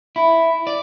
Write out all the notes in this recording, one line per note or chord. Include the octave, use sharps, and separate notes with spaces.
E4
D5